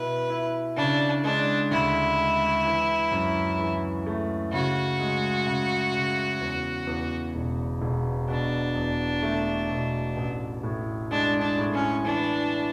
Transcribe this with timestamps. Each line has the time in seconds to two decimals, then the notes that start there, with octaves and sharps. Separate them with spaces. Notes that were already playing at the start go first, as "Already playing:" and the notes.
Already playing: B2 E4 B4
0.30 E4
0.76 C#3 D4
1.24 G#3 D4
1.71 D2 E4
2.18 G#3
2.65 E3
3.11 F#2
3.59 E3
4.06 A3
4.53 C#3 F#4
4.99 G#3
5.47 C#3
5.93 C#3
6.41 E2
6.87 E2
7.35 E1
7.82 E1
8.28 B2 D4
8.75 E2
9.22 A3
9.70 B2
10.16 A1
10.63 A2
11.11 G#3 D4
11.42 D4
11.58 A2
11.74 C#4
12.05 E3 D4